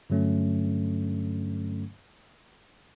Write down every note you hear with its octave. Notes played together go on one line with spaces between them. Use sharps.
G2 D3 F#3 A3 C#4